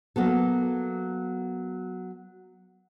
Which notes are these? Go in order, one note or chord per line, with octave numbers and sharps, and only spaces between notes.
F#3 A#3 B3 A4